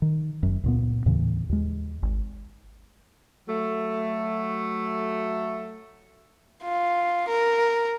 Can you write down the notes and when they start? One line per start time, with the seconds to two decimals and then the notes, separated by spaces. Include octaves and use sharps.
0.02 D#3
0.43 F#1 F#2
0.64 C#2 A#2 B3
1.06 D#2 A2 C#3 E3
1.49 D#2 G#3
2.03 G#1
3.48 F#3 A3
6.64 F4
7.28 A#4